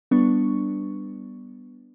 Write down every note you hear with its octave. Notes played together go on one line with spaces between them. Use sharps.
G3 B3 D4 C#6